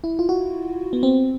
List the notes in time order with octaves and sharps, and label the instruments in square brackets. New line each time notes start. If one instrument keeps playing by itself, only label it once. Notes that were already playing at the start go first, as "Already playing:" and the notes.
[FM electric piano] E4
F4
F#4
B3
C4